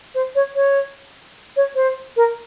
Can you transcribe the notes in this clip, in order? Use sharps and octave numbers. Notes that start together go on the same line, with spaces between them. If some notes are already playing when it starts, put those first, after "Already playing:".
C5
C#5
C#5
C#5
C5
A#4